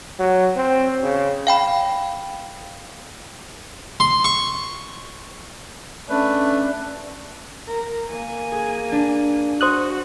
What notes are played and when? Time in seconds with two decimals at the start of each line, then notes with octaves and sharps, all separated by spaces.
0.19 F#3
0.56 C4
1.03 C#3
1.47 F5 G5 B5
4.00 C6
4.24 C#6
6.09 A3 C#4 D4 B4
7.68 A#4
8.09 A#3 G#5
8.52 G#4
8.92 D4
9.61 F#4 C5 D#6 F#6